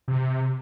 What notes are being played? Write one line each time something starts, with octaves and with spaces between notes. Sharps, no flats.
C3